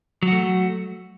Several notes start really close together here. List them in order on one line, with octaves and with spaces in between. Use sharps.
F#3 F#4 A3